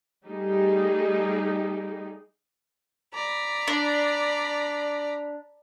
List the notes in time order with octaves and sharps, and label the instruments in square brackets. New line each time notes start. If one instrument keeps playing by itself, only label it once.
[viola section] G3 A3 D#4 G4 G#4
[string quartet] D5 A#5 B5
[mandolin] D4